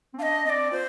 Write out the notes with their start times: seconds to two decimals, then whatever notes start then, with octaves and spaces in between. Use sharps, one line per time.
0.14 C4
0.18 D4 F5
0.22 D#5
0.45 C4 D5 D#5
0.71 F4 C5